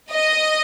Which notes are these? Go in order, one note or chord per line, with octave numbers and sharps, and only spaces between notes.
D#5